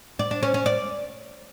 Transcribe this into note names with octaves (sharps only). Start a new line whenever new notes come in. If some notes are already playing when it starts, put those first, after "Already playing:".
D5
D4
C#4
C#4
D5